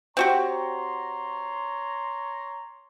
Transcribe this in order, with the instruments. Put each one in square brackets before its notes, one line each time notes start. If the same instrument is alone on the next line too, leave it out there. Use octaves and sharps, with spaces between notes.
[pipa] C4 F#4 G4 [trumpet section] C#5 A#5 C6